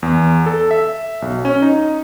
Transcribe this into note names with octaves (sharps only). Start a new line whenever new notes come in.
E2
A4
E5
B1
C#4
D#4